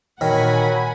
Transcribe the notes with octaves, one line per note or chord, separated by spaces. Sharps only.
A#2 D#3 F#3 F#5 G#5 B5